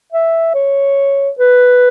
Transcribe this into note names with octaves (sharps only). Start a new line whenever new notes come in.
E5
C#5
B4